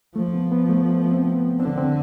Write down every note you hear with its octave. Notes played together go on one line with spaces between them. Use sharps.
F3 A3
B3
B3
A3
C4
B3
D3 C4
C4